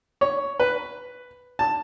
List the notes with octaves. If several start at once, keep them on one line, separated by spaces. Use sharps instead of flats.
C#5
B4
A5